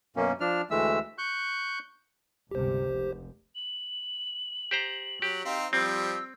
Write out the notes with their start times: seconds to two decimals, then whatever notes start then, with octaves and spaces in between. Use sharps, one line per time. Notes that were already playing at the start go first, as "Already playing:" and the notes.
0.16 F#2 B2 A#3 C#4
0.40 F3 D4 F6
0.71 D2 E3 G#3 A3 E5 E6
1.18 C#6 F#6 G6
2.51 G1 C#2 C3 G4 C5
2.87 F1
3.55 F#7
4.71 G4 C5 A#5
5.22 F#3 G4
5.45 C4 D#4 F5
5.73 F3 G3 C4 E6